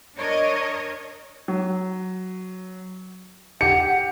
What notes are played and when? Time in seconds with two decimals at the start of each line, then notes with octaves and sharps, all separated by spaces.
0.16 D4 A#4 C#5 D#5
1.48 F#3
3.61 G4 F#5 C#7